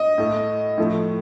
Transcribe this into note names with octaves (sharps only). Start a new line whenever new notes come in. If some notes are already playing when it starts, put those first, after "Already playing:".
Already playing: D#5
A2 A3
A2 F3 A3